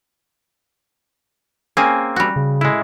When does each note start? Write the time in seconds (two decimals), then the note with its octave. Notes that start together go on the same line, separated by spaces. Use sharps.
1.77 A#3 C4 C#4 G#4 G#5
2.16 G3 F#4
2.36 C#3
2.61 A2 G#3 E4